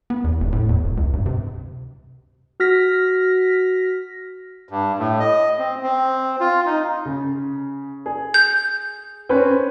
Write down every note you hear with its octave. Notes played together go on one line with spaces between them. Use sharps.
B3
E2
F1
A2
E2
D1
C#2
G2
C3
F#4 F6 A#6 B6
G2
A2
D#5
C4
C4
F4
D#4
C#3
G#4
G6
C4 C#4 B4